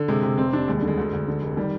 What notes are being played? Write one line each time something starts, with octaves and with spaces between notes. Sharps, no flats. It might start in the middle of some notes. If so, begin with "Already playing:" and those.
Already playing: D3
C3 G#3
C3
F1 C4
F1 D4
D#2 G#3
D3 G3
G#3
D2
D2
D3
F1
D#3 G3